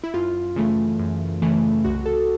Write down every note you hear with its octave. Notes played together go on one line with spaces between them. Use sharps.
E4
F#2 F4
C#3 E3 A3
F#2
C#3 E3 A3
C2 F#4
A4